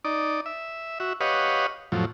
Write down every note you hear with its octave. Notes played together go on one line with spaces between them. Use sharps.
D#4 D5
E5
F#4 E5
G4 B4 C#5 D#5 F5 F#5
F2 A2 F3 F#3